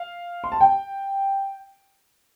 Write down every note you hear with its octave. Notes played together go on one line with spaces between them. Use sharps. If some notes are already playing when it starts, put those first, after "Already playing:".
Already playing: F5
C6
A5
G5